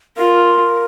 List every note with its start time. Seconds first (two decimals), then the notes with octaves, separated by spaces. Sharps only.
0.17 F4 A#4